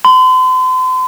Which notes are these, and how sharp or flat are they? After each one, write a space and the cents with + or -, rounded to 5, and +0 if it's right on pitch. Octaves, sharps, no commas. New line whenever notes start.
C6 -40